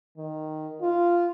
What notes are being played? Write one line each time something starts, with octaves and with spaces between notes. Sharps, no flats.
D#3
F4